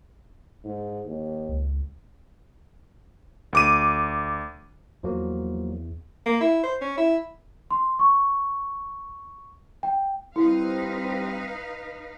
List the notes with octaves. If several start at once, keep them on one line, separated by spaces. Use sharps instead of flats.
G#2
D#2
C#2
D2 D6 D#7
E2 F3 F#3 A#3
A#3
E4
C5
C#4
E4
C6
C#6
G5
G3 C4 D#4 E4 B4 F5